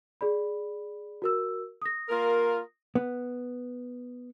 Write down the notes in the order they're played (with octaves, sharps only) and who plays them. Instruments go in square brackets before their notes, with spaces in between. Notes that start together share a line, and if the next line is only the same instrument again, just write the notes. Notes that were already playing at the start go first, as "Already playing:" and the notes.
[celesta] G#4 D5 B5
F#4 A#4 E6
D#6 A#6
[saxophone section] A#3 F4 A#4
[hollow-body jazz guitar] B3